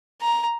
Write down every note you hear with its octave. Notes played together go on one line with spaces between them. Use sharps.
A#5